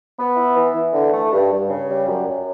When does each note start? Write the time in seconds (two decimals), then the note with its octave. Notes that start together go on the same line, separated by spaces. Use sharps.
0.17 B3
0.36 E4
0.56 E3
0.74 E3
0.93 D3
1.13 A3
1.32 G2
1.51 G2
1.69 C#3
1.88 G3
2.08 F#2
2.27 F#2